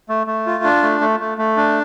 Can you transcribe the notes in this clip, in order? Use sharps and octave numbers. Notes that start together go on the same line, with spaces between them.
A3
A3
F4
D4
A3
A3
A3
A3
D4